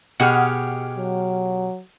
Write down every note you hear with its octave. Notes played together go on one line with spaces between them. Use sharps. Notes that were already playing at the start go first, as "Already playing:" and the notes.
B2 G4 G#4 F#5 F6
F#3